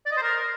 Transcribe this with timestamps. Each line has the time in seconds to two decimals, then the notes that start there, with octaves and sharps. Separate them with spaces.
0.06 D5
0.11 D#5
0.17 C5
0.22 A#4